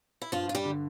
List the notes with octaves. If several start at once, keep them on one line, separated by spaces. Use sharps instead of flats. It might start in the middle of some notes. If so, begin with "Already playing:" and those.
E4
G2 F3 F4
F4
G3 G4
D3